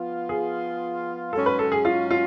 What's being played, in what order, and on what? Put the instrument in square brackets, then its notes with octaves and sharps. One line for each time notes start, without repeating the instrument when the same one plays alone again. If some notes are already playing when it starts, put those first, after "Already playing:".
Already playing: [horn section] F3 B3 F4
[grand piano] G#4
[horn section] G#2 F#3 C#4 [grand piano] A4
[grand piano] B4
A4
G#4
F4
F4